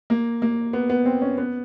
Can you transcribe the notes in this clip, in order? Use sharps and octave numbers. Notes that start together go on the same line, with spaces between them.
A#3
A#3
B3
B3
C4
C#4
B3